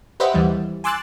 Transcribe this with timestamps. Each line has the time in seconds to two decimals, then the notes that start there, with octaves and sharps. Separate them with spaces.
0.20 G4 B4 C5 D#5 E5 F#5
0.34 D#2 E3 G3
0.84 G#5 C6 D6 E6 F#6 A6